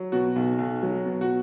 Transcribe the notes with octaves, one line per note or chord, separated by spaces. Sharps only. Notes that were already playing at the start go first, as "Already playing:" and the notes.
Already playing: F#3
B2 F#4
B1
B1
F#3
B2
F#4